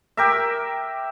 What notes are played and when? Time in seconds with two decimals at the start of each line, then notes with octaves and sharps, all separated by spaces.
0.17 G4 A#4 E5